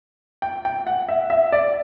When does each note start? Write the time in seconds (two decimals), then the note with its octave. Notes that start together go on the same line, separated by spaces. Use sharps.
0.42 G5
0.65 G5
0.87 F#5
1.09 E5
1.30 E5
1.52 D5